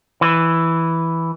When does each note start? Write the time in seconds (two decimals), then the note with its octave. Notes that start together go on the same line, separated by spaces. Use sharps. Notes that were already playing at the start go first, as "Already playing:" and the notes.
0.21 E3